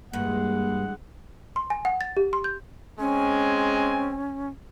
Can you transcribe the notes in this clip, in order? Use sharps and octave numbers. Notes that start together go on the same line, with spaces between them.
G2 E3 G#3 A#3 F#5
C6
G#5
F#5
A6
G4
C6
G6
G#3 C4 C#4 G#5